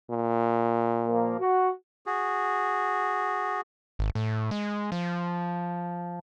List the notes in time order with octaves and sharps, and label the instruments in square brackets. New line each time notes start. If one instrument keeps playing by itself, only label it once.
[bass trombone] A#2
[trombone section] F3 A#3
F#4
[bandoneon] F#4 G#4
[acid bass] G#1
A2
G#3
F3